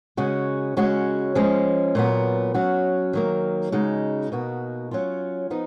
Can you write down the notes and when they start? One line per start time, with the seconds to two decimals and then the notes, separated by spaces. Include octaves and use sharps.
0.17 C#3 G#3 C#4 F#4
0.77 C#3 G#3 C#4 F#4
1.35 F3 G#3 C#4
1.95 A#2 F#3 B3
2.54 F#3 C#4 F#4
3.13 D#3 F#3 A#3
3.72 C#3 G#3 D#4 F#4
4.32 B2 A#3 D#4 F#4
4.91 F#3 C#4 F4
5.50 F3 B3 D#4